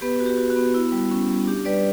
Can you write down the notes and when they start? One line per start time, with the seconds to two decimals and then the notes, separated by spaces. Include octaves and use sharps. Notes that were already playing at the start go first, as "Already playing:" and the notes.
0.01 B3 G4 B4
0.20 F#4
0.26 G4
0.38 F#4
0.50 F#4
0.56 B3
0.74 E4
0.92 G3
1.11 C#4
1.29 G3
1.47 D4 G4
1.65 G3 B4 D5